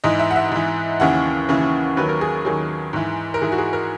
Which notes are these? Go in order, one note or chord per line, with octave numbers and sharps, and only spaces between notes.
G#2 E3 D#5
E5
F#5
E5
G#2 E3
D#2 C#3 E3 F#5
D#2 C#3 E3
D#2 D#3 F#3 B4
A#4
G#4
D#2 D#3 F#3 G#4
G#2 E3
A#4
G#2 E3 G#4
F#4
G#4
A#4